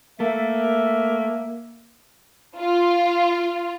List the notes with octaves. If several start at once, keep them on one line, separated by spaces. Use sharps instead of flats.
A3 A#3 E5
F4